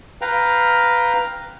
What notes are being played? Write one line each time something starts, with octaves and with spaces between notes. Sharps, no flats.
B4 F5 G5 A#5